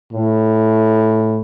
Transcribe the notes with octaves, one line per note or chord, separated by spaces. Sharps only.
A2